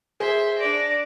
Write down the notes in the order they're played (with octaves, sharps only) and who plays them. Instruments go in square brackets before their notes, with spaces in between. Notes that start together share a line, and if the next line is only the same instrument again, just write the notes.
[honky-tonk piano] G#4 [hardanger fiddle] C5 E5
[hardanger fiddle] D4 D5 [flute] A#6